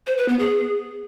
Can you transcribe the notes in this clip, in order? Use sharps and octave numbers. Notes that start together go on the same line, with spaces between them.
C5
B4
B3
G#4